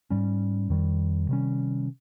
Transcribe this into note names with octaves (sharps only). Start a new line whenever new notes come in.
G#2 G3 C#4
F2 D#3 G3
C3 D#3 G3 C#4